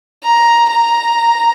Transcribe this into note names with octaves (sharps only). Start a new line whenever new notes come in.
A#5
A#5